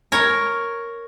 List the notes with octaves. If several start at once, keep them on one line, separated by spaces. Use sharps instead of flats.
A#4 C#5